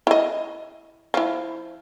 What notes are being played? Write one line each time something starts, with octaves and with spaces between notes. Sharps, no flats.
E4 D#5
F3 E4